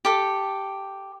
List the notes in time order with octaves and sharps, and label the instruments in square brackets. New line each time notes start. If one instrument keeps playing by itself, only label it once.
[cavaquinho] G4 A4